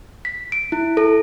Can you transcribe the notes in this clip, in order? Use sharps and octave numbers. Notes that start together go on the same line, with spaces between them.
B6
D7
E4
A4